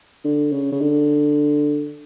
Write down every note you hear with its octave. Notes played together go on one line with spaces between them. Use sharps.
D3
C#3
C#3
D3